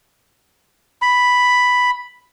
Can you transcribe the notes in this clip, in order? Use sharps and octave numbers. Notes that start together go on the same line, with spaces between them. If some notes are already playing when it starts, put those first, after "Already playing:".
B5